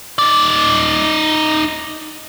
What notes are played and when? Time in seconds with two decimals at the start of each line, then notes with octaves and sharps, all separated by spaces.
0.18 D#4 D5